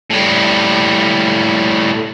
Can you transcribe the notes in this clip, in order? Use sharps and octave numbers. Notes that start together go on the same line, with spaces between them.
A2 G3